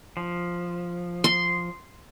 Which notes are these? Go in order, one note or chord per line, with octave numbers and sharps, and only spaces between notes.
F3
C6